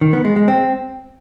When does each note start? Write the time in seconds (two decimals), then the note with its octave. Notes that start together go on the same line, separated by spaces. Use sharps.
0.01 D#3
0.13 B3
0.25 G#3
0.36 G#3
0.48 C4